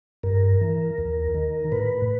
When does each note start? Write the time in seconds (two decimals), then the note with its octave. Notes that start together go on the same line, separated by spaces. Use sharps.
0.23 G2 A#4
0.61 E3
0.98 D#2
1.35 D#3
1.72 A2 B4